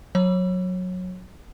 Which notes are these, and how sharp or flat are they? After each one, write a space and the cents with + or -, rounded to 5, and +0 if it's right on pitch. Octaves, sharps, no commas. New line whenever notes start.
F#3 -15 C#5 -20